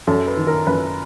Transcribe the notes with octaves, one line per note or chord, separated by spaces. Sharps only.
F#2 A4
B4
D#3
A#4
F#2 B4